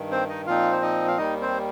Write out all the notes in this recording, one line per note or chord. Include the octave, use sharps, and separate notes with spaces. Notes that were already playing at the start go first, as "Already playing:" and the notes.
Already playing: G2 D#3
C4 C5
D#4 D#5
A#2 F3 C4 D#4 F4 F5
C5
D#4 D#5
F5
D#2 D#3 G3 D#4 D#5
C4 C5